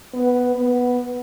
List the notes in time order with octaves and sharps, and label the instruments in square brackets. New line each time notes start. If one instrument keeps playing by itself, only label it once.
[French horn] B3
B3